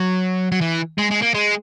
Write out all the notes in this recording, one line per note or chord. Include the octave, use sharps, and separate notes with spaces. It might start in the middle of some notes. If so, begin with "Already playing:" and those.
Already playing: F#3
F#3
E3
G#3
G#3
A#3
G#3